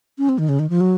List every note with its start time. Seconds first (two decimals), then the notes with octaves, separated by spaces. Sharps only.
0.18 C#4
0.29 C4
0.38 D#3
0.49 C#3
0.59 D#3
0.70 F3
0.80 F#3